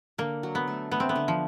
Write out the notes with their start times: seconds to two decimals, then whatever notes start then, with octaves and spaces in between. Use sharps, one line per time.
0.18 D3 A#3
0.43 F#3
0.55 B3
0.68 A3
0.91 A3 B3
1.00 C4
1.09 B3
1.16 D3
1.28 F3